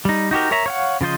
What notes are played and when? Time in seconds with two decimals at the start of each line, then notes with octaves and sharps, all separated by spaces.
0.05 G3 D#4
0.31 D#4 F#4 G4 A#4
0.51 A#4 C#5 E5 A#5
0.66 C#5 F5 F#5
1.01 C#3 F3 F4 C5 D#5